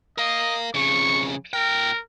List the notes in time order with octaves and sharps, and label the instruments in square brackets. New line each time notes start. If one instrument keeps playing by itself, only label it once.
[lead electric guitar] A#4 F5 [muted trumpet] D#5
[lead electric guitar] F2 C#3 [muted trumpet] C#6
[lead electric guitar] A#2 G5 [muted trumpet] A#4